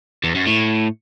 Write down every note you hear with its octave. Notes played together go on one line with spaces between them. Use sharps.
E2
F#2
A2